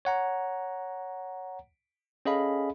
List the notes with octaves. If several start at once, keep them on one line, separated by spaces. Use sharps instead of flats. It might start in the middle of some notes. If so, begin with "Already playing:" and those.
C#5 F#5 A#5
C#4 G#4 A4 D#5 F5 B5